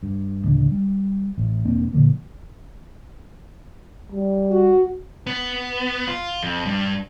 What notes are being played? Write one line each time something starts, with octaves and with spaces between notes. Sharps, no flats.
G2
A1 D2 C#3 D4
G3
A1
E1 A#3 C4 D4
A#2 D3 F3 A#3
G3
F#4
B3
F4
F2
G2